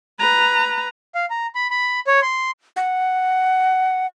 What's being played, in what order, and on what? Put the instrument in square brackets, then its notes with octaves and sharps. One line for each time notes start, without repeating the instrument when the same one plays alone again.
[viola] B4 A#5
[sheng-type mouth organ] F5
A#5
B5
B5
C#5
C6
[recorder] F#5